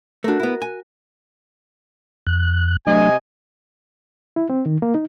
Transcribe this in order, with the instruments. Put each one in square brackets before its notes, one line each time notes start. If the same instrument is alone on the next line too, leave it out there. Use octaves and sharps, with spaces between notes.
[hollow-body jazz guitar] A3 D4 [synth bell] F#4 A#4
[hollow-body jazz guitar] B3 E4
G#5
[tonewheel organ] F2 F#6
[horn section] C3 D#5 G#5 [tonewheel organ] F#3 A3 D4
[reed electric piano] E4
C4
D#3
A#3
D#4